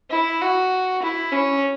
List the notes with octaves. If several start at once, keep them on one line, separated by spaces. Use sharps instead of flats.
E4
F#4
E4
C#4